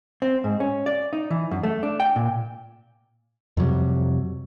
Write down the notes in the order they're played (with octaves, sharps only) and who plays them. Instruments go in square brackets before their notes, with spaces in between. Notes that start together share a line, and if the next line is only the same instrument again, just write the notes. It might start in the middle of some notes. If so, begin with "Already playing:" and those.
[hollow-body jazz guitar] C4
G#2
C#4
D5
D#4
E3
F#2
A3
D4
G5
A#2
[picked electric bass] F2 C3 F#3 G3